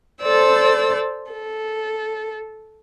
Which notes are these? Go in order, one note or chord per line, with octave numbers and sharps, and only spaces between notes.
A4 C5 D5 E6
A4